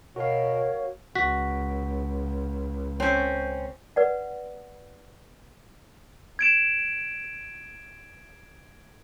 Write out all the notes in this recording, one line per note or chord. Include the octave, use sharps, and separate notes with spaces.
B2 F#4 A#4 C#5 F5
C#2 F#4 B6
C4 C#4 C#5 G6
B4 D5 F#5
G#6 D7 E7